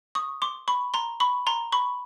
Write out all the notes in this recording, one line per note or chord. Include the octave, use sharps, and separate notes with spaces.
C#6 D#6
C6 D6
B5 C#6
A#5 C6
B5 C#6
A#5 C6
B5 C#6